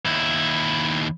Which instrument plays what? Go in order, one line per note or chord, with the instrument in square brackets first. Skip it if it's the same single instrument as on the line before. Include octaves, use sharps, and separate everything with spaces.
[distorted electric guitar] D#2 E4